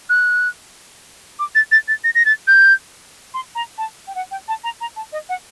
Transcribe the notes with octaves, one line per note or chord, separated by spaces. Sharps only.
F#6
D6
A6
A6
A6
A#6
A#6
A6
G6
C6
A#5
A5
G5
F#5
G5
A5
A#5
A#5
A5
D#5
F#5